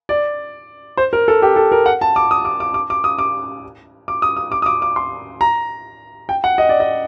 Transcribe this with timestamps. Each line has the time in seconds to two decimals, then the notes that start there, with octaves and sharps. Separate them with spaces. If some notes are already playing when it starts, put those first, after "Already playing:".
0.09 D5
0.97 C5
1.13 A#4
1.28 A4
1.42 G4
1.56 A4
1.72 A#4
1.86 F#5
2.01 A5
2.16 D6
2.31 D#6
2.45 D6
2.60 D6
2.74 D6
2.90 D6
3.04 D#6
3.19 D6
4.08 D6
4.22 D#6
4.37 D#6
4.52 D6
4.62 D#6
4.66 D6
4.82 D6
4.96 C6
5.41 A#5
6.29 G5
6.44 F#5
6.58 D#5
6.69 D5
6.80 D#5